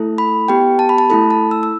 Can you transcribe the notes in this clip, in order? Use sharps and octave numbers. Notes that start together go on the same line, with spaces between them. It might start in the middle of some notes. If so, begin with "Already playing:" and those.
Already playing: A3 E4 A4
B5
B3 G4 G5
A5
B5
A5
A3 E4 A4 B5
A5
E6
E6